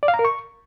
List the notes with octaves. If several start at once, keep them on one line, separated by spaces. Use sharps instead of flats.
D5
F5
A#5
A#4
C#6